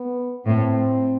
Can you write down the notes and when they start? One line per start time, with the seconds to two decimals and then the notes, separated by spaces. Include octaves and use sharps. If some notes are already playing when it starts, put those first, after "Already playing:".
Already playing: B3
0.46 A2 C4